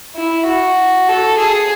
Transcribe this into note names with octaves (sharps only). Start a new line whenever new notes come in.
E4
F#4
A4
G#4